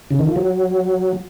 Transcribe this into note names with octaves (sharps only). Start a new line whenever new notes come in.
C#3
D#3
F3
F#3